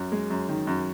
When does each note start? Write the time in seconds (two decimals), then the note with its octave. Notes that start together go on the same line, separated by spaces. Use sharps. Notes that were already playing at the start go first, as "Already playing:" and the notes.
Already playing: F#2
0.12 G#3
0.30 F#2
0.49 D#3
0.67 F#2